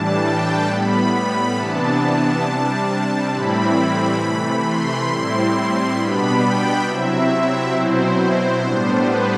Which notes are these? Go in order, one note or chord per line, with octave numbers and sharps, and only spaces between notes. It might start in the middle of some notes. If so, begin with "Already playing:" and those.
Already playing: A2 E3 G3 D4 A5
G5
A2 G3 B3 B5
B5
C3 E3 B3 D4 A5
A5
C3 G3 D4
A2 E3 G3 C4 E4 B5
C3 E3 A3
C6
A2 G3 C4 E4 C6
B2 G3 B3 D4 B5
G5
C3 F#3 C4 E4 E5
E5
B2 F#3 C4 E4 C5
A2 G3 B3 D4
B4